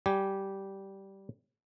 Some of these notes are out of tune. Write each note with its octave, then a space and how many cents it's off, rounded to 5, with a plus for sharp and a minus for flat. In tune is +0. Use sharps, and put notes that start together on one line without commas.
G3 -10 G4 -10 G#5 +0